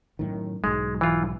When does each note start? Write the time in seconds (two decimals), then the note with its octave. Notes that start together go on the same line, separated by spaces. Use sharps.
0.19 F#2 A2 D#3
0.64 B1 G#2 G#3
1.01 E3 F4